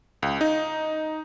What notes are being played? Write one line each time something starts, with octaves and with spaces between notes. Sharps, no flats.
C#2
D#4